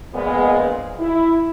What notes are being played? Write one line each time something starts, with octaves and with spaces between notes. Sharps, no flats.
A#1 A#2 G#3 B3
E4